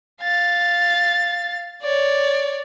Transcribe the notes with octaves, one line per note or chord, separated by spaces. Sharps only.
F5 A6
C#5 D5